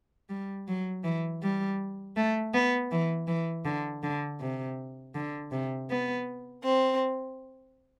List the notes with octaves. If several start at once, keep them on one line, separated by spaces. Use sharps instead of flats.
G3
F#3
E3
G3
A3
B3
E3
E3
D3
D3
C3
D3
C3
B3
C4